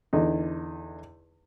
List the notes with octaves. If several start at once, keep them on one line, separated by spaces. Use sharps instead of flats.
E2 D3 D#4